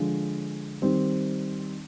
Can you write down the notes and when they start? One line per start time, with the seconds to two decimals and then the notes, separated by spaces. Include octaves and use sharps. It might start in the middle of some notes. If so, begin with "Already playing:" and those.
Already playing: D3 F3 G#3
0.82 D#3 G3 C4